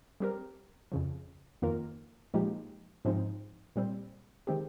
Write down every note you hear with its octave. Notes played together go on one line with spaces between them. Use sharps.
G3 C4 G4 A#4
F2 C#3 F3
F2 D#3 A#3 F4 A#4
A#2 F3 G#3 D#4 G4
G#2 F3 G#3 C4 D#4
A#2 G3 C4
D#3 G#3 C4 G4